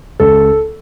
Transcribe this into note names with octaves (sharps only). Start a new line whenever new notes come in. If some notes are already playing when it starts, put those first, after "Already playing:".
C#2 A4